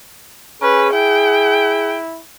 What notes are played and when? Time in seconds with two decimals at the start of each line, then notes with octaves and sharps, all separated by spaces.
0.62 C#4 G#4 B4
0.93 E4 G5